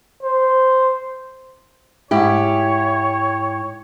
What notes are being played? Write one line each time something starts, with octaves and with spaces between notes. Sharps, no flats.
C5
G#2 E4 G4 C#5